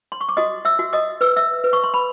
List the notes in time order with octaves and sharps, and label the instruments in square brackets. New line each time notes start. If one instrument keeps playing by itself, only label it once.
[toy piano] C6
C#6
D6
F#4 D#5 D#6
E5 E6
F#4
D#5 D#6
B4 E6
E5 E6
B4
C#6
C6
B5